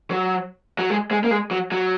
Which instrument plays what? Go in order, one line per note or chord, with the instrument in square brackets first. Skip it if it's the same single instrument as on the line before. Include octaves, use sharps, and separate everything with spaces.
[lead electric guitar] F#3
F#3
G#3
G#3
A#3
G#3
F#3
F#3